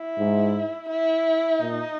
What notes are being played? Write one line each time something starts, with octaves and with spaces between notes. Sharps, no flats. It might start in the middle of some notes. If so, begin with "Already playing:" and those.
Already playing: E4
G#2
E4
A#2 D#4